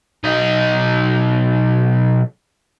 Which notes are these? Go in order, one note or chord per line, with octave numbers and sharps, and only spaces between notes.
B1 D#4